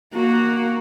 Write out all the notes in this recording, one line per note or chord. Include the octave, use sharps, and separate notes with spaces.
A#3 F#4